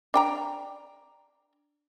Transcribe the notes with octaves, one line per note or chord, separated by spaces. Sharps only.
D4 G5 A#5